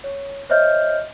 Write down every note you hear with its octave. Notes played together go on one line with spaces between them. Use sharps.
C#5
C5 C#5 D#5 E5 F6 G6